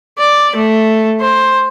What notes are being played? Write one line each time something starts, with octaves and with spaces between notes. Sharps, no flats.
D5
A3
C5